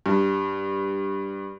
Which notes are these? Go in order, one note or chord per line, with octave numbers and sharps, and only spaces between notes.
G2